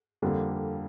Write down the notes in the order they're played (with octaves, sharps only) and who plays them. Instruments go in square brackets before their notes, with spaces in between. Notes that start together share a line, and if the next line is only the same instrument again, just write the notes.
[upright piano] F2 D3 G3 A#3